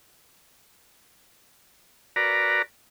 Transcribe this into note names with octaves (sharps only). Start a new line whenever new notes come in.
F#4 A#4 B4 D5 A#5